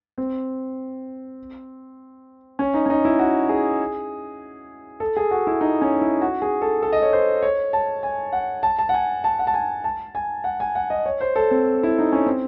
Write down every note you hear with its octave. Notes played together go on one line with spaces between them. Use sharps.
C4
C#4
D#4
C#4
D#4
E4
F#4
G#4
A4
G#4
F#4
E4
D#4
C#4
E4
F#4
G#4
A4
A4
D#5
C#5
C5
C#5
A5
G#5
F#5
A5
A5
F#5
G#5
A5
F#5
A5
G#5
A5
G#5
F#5
G#5
F#5
D#5
C#5
C5
A4
C4
E4
D#4
C#4
C4